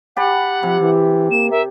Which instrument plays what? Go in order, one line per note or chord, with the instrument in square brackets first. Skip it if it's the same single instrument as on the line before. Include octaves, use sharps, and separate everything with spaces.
[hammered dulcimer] G4 A5 B5 [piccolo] F#5
[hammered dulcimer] C3 [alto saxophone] F3
[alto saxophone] E3
[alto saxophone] A#3 [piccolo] E7
[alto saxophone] A#4 [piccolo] E5